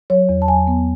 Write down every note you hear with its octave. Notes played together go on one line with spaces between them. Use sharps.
F#3 C#5
E2
A5
F#3 G#5
B3